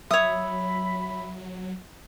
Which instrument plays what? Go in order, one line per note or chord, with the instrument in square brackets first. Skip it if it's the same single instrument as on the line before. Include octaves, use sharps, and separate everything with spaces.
[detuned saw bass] F#3 [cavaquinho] C#5 D#6 [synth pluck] E5 [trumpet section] B5